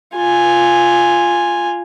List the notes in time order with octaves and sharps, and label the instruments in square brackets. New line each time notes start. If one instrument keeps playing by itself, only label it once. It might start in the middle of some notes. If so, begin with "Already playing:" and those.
[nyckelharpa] F4 G#5